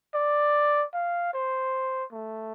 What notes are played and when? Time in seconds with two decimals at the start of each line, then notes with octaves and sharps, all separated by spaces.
0.14 D5
0.94 F5
1.33 C5
2.12 A3